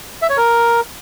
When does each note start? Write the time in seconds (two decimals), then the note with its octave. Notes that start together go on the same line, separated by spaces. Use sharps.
0.22 E5
0.30 C#5
0.37 A#4